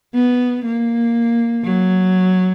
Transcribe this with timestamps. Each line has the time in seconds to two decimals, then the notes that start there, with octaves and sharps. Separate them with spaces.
0.14 B3
0.64 A#3
1.64 F#3